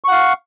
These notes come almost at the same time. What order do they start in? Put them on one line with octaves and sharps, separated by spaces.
C#6 F#5 F5